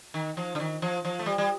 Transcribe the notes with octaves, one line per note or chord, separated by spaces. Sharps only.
D#3
F3
D3
D#3
F3
F3
A3
G3
G3